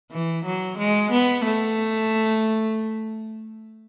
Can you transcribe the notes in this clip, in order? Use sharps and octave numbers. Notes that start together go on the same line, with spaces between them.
E3
F#3
G#3
B3
A3